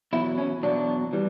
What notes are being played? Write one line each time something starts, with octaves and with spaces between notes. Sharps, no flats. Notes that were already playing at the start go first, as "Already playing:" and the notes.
E2 B2 F#3 E4
C#4
E2 B2 F#3 D4
E3 G3